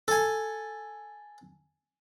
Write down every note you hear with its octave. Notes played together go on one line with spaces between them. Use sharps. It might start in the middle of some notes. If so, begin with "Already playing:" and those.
A4 G#5